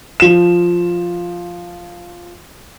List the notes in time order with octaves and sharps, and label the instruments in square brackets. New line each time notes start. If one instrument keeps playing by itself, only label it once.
[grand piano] F3 E7